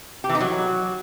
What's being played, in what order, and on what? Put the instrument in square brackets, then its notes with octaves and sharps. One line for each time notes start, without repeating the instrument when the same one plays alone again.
[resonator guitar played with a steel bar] G4
E3
D#4
F#3